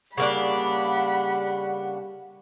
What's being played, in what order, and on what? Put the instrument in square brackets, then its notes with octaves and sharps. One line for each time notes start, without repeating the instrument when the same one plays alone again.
[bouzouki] C#3 A#3 D4 [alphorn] G3 [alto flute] F#5 [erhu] B5